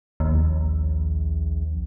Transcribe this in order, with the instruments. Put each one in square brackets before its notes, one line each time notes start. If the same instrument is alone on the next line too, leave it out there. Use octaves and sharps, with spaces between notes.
[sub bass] A#1 [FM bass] D#2